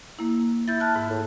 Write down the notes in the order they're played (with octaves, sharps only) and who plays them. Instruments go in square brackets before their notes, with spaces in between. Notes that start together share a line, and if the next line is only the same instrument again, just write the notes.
[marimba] A#3 E4
[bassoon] E4 [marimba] G6 A6
[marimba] A5 F6 F#6
G#2
[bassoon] A2